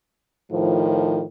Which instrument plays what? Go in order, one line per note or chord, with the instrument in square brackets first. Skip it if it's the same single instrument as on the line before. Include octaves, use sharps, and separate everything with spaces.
[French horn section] A2 D#3 F3